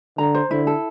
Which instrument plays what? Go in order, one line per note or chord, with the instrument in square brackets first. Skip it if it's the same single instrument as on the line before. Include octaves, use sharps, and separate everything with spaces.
[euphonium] D3 [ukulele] A#5
[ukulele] C5
[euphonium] D3 [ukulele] E4
[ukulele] A4